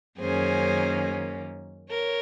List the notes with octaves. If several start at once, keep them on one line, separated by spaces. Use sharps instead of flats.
F#2 D#3 A#3 C#4 G#4 C5
A#4 C#5